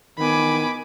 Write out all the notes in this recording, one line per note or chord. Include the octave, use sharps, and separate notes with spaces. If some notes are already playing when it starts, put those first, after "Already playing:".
D#3 B3 G#5 B5 D6